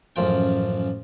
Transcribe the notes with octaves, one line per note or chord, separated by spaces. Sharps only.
A1 F#2 F3 G5